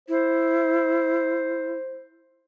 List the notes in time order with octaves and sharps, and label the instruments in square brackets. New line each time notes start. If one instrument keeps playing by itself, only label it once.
[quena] E4 [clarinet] C5